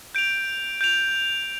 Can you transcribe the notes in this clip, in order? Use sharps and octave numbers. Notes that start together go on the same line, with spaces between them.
G6 D7 F7
G6 D7 F7